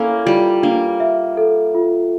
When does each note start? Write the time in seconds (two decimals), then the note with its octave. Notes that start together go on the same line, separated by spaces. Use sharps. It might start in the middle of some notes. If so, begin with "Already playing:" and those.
Already playing: A#3 C#4 E4 A4
0.25 G3 F4
0.63 A#3 D4
1.00 E5
1.37 A4
1.75 F4